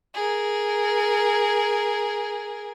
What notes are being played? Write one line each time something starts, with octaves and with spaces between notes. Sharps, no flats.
G#4 A#4